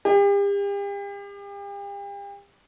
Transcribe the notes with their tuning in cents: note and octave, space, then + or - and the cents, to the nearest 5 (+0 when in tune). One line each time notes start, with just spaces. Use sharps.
G4 +40